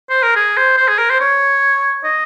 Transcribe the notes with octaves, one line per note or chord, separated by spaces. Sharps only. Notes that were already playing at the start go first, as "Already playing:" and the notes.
C5
A#4
G#4
C5
C5
G#4
A#4
C5
C#5
D#5